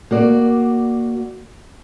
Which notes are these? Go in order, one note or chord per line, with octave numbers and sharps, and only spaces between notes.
A#3 F#4 D5